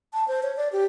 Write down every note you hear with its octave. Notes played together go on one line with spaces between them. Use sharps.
A5
C5
C#5
D5
G4